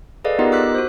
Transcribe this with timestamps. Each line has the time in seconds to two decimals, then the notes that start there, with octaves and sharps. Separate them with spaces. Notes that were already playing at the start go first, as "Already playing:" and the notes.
0.24 G#4 A4 B4 D5 D#5 F5
0.39 B3 D#4 F4 G4 A#4 D#5
0.52 D6 E6 F#6 B6
0.75 F#4 C5